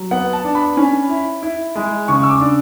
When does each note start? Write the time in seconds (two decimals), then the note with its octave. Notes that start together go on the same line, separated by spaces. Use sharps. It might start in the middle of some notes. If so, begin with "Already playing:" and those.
Already playing: F#3
0.11 B3 F#5
0.33 A5
0.44 D4
0.55 B5
0.77 C#4
1.09 E4
1.43 E4
1.75 G#3
2.08 C#3 C#6
2.23 E6
2.30 D6
2.40 D4